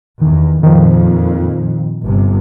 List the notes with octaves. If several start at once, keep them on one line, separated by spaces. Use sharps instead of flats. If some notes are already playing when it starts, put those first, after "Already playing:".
E2 D#3
F2 A#2 D#3 F3
G1 C3